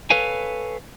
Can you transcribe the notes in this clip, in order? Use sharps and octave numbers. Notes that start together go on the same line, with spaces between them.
A4 B4 C#5 F5 G#5